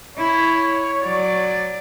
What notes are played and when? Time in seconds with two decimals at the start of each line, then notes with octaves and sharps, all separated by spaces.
0.18 E4 C#5
1.03 F#3 D5